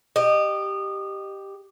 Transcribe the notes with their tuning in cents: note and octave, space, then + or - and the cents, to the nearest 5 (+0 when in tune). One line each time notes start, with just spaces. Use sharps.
G4 +0 D#5 -25